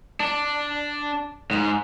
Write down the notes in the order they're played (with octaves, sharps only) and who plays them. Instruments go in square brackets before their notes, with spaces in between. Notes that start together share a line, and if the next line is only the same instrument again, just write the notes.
[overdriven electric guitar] D4
G#2